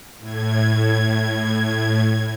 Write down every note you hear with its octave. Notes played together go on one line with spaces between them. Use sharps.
A2 G#6